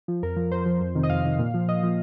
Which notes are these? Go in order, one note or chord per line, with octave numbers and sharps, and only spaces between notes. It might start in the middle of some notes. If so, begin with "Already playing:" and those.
F3
F2 A#4
F3
F2 C5
F3
F2
C3 D#3
D#5
F2 F5
C3 D#3
A#2
F3
A#2 D#5
F3